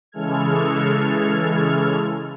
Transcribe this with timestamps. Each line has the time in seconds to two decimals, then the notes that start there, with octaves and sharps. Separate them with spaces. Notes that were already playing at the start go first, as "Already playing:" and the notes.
0.12 C#3 E3 G#3 A4 F6 G#6